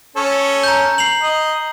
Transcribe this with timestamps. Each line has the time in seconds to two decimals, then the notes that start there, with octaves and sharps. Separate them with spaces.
0.16 C#4 A4 C#5
0.63 A#5 G6
0.98 C7 F7 F#7
1.21 D#5